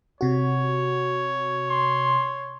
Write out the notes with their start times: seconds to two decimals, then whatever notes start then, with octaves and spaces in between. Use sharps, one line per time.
0.21 C3 F#4 C#5
1.69 C6